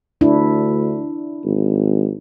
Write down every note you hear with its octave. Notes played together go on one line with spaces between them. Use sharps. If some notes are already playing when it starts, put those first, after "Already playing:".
D2 D4 E4
G#1